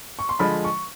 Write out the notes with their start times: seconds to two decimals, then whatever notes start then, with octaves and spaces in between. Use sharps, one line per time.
0.19 C#6
0.29 C6
0.39 D3 F3 G#3 B5
0.64 C#6